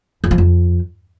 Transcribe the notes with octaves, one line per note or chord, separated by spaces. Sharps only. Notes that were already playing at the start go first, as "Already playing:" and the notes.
F2
F3
F2